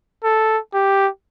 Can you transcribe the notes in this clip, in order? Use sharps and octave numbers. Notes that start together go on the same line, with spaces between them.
A4
G4